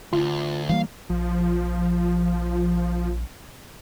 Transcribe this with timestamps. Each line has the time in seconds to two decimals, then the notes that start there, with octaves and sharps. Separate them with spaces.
0.13 D2 F4
0.69 E3 G3 A#3 F5
1.09 A#1 F3